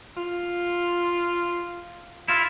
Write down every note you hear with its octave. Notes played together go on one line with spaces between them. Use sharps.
F4
E4 F4